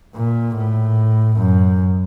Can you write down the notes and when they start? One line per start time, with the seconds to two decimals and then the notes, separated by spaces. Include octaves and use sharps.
0.15 A#2
0.56 A2
1.38 F#2